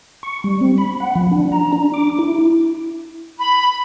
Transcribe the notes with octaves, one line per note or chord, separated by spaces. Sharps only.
C#6
G3
C4
B5
F#5
F3
D4
A#5
D4
D6
E4
B5